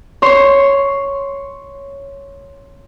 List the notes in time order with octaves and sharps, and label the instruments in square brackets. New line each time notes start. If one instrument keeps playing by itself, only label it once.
[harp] C#5 C6